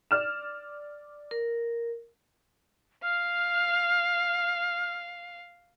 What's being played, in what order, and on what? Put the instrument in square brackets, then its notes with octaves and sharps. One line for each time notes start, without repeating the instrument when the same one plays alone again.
[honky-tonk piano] D5 F6 E7
[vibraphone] A#4
[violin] F5 [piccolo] F6